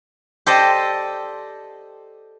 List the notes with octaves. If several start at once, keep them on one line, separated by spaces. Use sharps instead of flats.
G4 A4 C5 D5 D#5